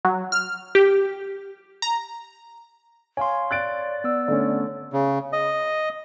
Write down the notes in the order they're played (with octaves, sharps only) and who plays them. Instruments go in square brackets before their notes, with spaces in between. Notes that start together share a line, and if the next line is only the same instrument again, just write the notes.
[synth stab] F#3
F6
G4
A#5
[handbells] C#5 F5 C6 [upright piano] G#5
[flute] D5 [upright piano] F#6 A6 D7
[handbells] B3 E6
[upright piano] D3 A3 C#4
[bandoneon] C#3
D#5